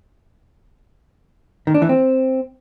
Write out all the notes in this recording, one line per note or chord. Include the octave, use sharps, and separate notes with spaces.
D#3
D4
E3
C4